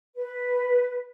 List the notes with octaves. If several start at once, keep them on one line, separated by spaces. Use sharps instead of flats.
B4